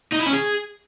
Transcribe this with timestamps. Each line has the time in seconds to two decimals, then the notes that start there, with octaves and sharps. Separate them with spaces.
0.13 D#4
0.20 E4
0.27 C#4
0.34 G#4